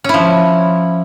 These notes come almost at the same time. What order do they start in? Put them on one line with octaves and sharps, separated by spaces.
C#4 E4 F3